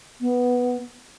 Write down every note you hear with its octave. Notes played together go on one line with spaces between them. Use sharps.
B3